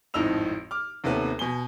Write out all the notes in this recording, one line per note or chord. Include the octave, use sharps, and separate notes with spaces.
G#1 F2 A2 D#4 E6 F7
D6 F6
D#2 C3 A3 B3 C#4
B2 G#5 G7